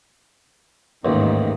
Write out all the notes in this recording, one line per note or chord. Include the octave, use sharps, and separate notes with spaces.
A1 D#2 G#2 D#3